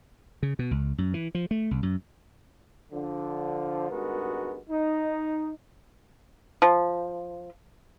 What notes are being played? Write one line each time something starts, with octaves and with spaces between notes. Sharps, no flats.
C#3
B2
C#2
F#2
E3
F3
A3
C2
F#2
D3 F3
G#1 G2 G#3 B3 F#4 A#4
D#4
F3